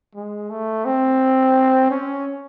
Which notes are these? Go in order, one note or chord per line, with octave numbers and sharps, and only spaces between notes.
G#3
A3
C4
C#4